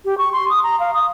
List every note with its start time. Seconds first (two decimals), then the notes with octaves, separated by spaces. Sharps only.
0.05 G4
0.18 C#6
0.33 C6
0.50 D#6
0.63 A#5
0.80 F5
0.94 D#6